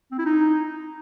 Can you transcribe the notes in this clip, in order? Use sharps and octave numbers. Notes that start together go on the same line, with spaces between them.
C4
E4
D#4